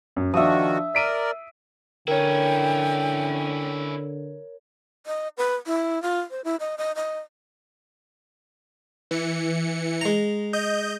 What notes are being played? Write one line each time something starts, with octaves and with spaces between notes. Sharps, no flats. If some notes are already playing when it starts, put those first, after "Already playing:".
F#2
D#3 F3 D4 F#4 E5 D#6
A#4 D5 B6 D7 D#7
D3 C#4 E4 A#4 C#5 G5
D#5
B4
E4
F4
C5
E4
D#5
D#5
D#5
E3 C#7
G#3 A#5
D#5 G6